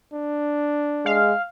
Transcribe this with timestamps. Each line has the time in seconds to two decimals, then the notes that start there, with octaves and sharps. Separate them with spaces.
0.14 D4
1.06 G#3 F5